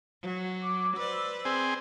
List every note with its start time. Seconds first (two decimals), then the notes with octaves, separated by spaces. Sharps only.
0.22 F#3
0.61 D6
0.96 B4 C5 D5 E6
1.45 C4 G#4